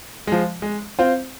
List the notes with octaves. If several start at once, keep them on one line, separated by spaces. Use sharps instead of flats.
F3 G#3
G#3
C4 F4 C5